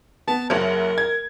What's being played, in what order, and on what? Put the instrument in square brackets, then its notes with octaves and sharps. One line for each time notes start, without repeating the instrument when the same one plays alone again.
[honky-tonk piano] B3 [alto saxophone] A5
[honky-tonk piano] F#1 F#3 [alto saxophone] A#4
[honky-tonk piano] G#6